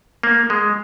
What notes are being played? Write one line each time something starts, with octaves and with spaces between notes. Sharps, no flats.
A#3
G#3